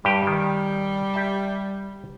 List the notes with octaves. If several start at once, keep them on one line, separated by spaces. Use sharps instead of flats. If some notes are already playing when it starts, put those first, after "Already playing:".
G2 G3 G4 G5
D#3
G4 E5 A5